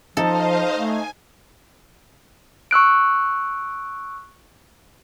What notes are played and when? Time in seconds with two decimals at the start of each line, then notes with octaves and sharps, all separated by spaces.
0.17 F3 D#4 A4 C5 D#5 F5
0.77 A3 G#5
2.71 C#6 E6 F#6 D7